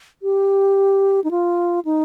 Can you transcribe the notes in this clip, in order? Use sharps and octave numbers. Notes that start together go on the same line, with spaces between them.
G4
D#4
F4
D#4